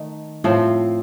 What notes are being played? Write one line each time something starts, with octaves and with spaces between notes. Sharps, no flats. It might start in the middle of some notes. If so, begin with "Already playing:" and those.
Already playing: D#3 A3
A2 F3 C4